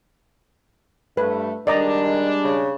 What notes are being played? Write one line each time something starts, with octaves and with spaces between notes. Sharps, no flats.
G2 A3 B4
D#3 G3 G#3 D4 D5 D#5 A#5
C#3